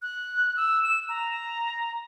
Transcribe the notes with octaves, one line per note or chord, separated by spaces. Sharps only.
F#6
E6
E7
A#5